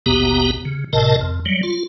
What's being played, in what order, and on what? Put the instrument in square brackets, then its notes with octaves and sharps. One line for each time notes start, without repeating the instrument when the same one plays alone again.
[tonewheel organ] A1 D#2 B2 B3 G4 A#5
C#3
G#1 A2 C3 A#4 D#5 A5
F2
F#3 G3
F4